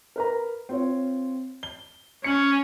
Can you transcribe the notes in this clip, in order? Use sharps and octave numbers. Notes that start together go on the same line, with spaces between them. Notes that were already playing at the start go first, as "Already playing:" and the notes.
A#4 B4 A#5
C4 F4 C#5
G7
C#4 C#7 F#7